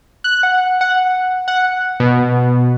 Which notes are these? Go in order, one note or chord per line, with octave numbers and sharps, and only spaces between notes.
F#6
F#5
F#5
F#5
B2